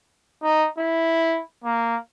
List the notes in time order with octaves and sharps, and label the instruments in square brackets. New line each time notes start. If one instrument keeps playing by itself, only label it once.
[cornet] D#4
E4
A#3